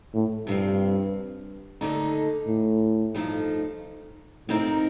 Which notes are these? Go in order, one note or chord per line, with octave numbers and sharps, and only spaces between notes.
A2
G2 C3 F3 C4
D#2 D3 A3 D#4
A2
G2 F3 A3 D#4
A2 C3 F3 C4 D#4 A#4